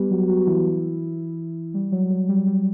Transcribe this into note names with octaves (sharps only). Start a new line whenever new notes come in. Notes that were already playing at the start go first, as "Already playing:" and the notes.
Already playing: G3 B3 G4 B4
F#3 F#4
F#3 F#4
E3 E4
G3
F#3
F#3
G3
G3